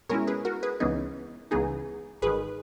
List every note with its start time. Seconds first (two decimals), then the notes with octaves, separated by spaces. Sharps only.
0.09 B2 G#3 C#4 E4 A#4 C#5
0.27 G#4 B4
0.45 F#4 A#4
0.63 G#4 B4
0.80 C#2 C#3 E3 B3 D#4 G#4
1.51 C#2 C#3 E3 B3 D#4 G#4
2.22 G#1 G#2 D#3 G#4 B4